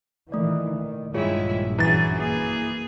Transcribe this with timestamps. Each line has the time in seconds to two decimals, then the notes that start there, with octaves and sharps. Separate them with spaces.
0.32 A#2 D#3 E3 A3 D5
0.78 D#3
1.14 A#1 G2 D#3 G#3 E4 F4 G#4 C#5
1.78 F#2 E3 G#4 A#5 A6
2.19 A#3 G#4